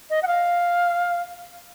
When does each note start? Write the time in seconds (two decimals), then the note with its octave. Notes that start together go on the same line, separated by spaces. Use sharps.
0.10 D#5
0.23 F#5
0.27 F5